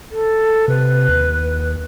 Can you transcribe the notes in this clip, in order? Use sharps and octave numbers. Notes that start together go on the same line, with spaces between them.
A4
C3 B4
D#2